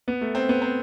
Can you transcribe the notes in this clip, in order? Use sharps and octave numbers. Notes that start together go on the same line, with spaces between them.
B3
A3
C4
B3
C4